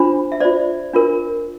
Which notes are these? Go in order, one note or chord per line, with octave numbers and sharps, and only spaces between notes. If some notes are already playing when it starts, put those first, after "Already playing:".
Already playing: D4 F4 C5
E5
F4 C5 D5
D4 F4 A#4